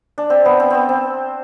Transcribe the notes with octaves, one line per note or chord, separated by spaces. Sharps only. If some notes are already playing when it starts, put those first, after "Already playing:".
D4
C4
B3
C4
B3 C4
C4